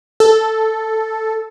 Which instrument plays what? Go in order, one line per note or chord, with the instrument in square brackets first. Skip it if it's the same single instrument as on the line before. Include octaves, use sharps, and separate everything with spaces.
[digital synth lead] A4